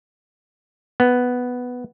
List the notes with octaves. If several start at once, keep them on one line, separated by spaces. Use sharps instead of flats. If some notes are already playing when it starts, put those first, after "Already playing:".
B3